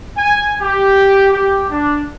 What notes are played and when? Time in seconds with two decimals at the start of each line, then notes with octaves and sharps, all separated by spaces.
0.18 G#5
0.61 G4
1.32 G4
1.70 D4